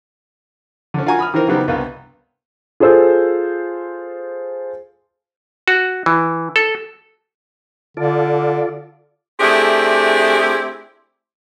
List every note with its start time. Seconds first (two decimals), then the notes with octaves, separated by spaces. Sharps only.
0.94 D3 C#4
1.06 F4 F#4 F#5 G#5 A#5 C#6
1.19 B5 D#6 F6
1.34 D#3 E3 C4 A#4
1.48 C#3 F#3 B3 C4 D#4 G4
1.68 C2 G2 B3 F5
2.80 F4 G#4 A4 C5 E6
5.68 F#4
6.06 E3
6.56 A4
7.97 D3 F4 A4 D5
9.40 A3 C4 D4 E4 G4 G#4